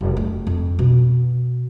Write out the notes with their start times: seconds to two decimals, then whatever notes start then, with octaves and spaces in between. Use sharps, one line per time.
0.01 F1
0.17 A3
0.47 F2
0.79 B2